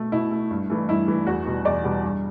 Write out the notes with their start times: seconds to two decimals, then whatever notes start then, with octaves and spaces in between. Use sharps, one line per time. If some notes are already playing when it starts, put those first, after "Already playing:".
Already playing: B2 A3
0.12 B2 E4
0.31 A3
0.51 G2
0.70 E3 A3
0.89 G2 E4
1.08 E3 A3
1.27 E2 F#4
1.46 B2 G3 B3
1.65 E2 D5
1.84 B2 G3 B3
2.03 G2